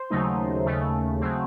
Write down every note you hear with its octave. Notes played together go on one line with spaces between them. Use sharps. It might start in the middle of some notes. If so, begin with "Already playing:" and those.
Already playing: C5
D#2 C#3 F#3 A3 D#4
D#2 C#3 A3
C#3 F#3 A3 C4